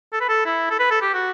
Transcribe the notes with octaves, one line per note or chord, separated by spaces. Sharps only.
A4
B4
A4
E4
A4
B4
A4
G4
F#4